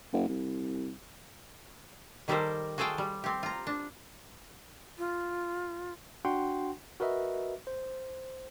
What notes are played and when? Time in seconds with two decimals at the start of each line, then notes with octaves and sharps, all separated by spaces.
0.13 F#1
0.28 C2
2.28 D#3 G3 G4 A4 A#4 C5
2.78 F#4 G#4 A4 C5 F5 G5
2.98 G3
3.24 C4 G4
3.43 F4 A#5
3.67 D4
4.98 F4
6.25 D4 F#4 F#5 G5 C6
7.00 F#4 A#4 B4 D#5 E5
7.67 C5